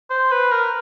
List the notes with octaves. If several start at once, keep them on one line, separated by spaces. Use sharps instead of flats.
C5
B4
A#4